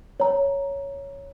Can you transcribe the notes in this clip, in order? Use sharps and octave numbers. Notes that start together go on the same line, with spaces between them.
C#5 A#5